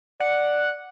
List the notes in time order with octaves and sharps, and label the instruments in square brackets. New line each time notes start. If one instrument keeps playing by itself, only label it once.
[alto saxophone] D5 [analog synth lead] F#5